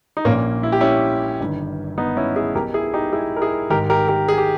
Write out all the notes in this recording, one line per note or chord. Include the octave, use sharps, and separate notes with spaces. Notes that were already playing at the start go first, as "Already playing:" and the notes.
D#4
A#1 A#2 A#3 C#4
E4
G4
C#4 E4
G1 G2 D#3
B3 D#4
C#4 E4
E4 G#4
B1 B2 G4 A#4
E4 G#4
D#4 G4
E4 G#4
A#4
E4 G#4
G#1 G#2 D#3 G4 A#4
G4 A#4
G4 A#4
G#4
G4